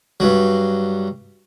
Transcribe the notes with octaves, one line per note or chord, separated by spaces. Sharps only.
G2 F#3